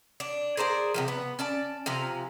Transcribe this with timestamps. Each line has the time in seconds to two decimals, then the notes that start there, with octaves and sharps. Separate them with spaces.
0.20 D4
0.57 G#4 A#4 C5 D5
0.94 C3 E3 F3
1.08 B3
1.39 C#4 D5 A5
1.86 C3 F3 G#5 A#5